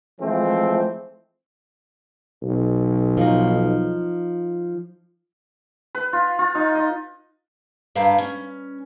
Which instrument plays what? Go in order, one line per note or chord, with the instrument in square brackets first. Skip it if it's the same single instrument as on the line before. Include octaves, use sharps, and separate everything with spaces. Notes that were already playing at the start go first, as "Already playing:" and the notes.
[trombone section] E3 F3 G#3 A3 C4
[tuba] B1
[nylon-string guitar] F3 D#4
[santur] B4
F4
F4
D#4
D#5
[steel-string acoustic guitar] G2 D3 B4 F5 A#5
C#4